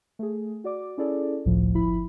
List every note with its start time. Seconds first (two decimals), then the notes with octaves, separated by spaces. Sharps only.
0.19 A3 G#4
0.64 F#4 D5 D6
0.98 C#4 E4 G#4 A4 D5
1.45 G#1 C#2 A2 F3
1.74 G1 F3 E4 B5